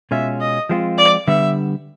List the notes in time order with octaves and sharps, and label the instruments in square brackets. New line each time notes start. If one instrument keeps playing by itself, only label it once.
[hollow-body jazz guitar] B2 G#3 C#4 F4 [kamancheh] E5
[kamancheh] D#5
[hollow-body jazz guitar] F3 G#3 C4 F4
[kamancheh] D5
[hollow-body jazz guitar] D3 G3 B3 [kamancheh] E5